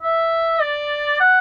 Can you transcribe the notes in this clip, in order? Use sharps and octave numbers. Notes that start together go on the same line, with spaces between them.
E5
D5
F#5